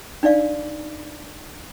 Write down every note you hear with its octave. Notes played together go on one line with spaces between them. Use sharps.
D4 D#4 D5 F5